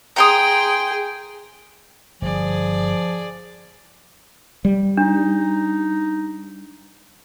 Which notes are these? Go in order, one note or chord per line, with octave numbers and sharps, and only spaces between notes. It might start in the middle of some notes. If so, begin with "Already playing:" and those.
G#4 G5 A#5 C6 D#6
G1 F3 G#4 D5
G3
D4 D#4